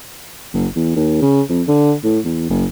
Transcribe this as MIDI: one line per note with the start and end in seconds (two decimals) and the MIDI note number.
0.53 0.67 30
0.75 0.94 40
0.96 1.18 39
1.21 1.41 49
1.49 1.62 41
1.67 1.94 50
2.04 2.19 45
2.24 2.46 40
2.50 2.65 30